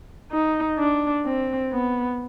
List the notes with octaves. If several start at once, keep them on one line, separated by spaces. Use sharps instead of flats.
D#4
D4
C4
B3